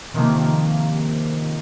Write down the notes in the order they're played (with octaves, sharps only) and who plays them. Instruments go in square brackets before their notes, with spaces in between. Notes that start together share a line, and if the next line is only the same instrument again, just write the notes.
[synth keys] C3 D#3 F3 A#3